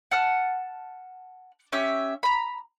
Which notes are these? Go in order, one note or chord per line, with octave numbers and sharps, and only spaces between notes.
F#5 A5 F6
C#4 G4 E5
A#5 B5